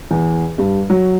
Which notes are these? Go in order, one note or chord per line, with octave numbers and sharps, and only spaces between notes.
E2
G2
F#3